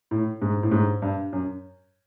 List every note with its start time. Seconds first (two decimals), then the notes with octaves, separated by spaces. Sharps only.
0.11 A2
0.42 G#2
0.63 A2
0.72 G#2
1.02 G2
1.33 F#2